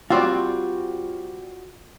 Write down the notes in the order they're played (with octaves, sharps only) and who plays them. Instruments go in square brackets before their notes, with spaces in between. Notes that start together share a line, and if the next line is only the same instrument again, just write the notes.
[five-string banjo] G3 C4 D5 [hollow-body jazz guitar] F4 F#4